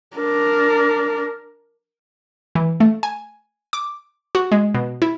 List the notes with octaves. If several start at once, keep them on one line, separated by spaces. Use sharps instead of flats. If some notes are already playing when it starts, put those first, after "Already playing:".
D4 A#4
E3
A3
G#5
D6
F#4
G#3
B2
E4